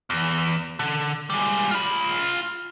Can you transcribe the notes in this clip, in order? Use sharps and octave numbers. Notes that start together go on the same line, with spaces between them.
E2
D3
G3 G#3
F4 B5